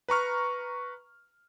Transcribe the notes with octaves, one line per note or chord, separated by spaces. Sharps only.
B4 A#5 C#6 F6